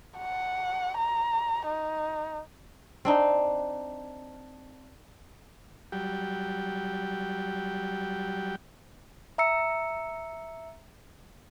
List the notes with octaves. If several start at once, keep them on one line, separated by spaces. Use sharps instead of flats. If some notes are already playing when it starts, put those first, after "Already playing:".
F#5
A#5
D#4
C4 D4 D#4
F#3 G3 G4
E5 A#5 E6 C#7